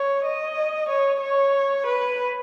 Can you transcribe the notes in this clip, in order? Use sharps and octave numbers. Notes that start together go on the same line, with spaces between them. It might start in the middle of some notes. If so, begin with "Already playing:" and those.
Already playing: C#5
D#5
C#5
C#5
B4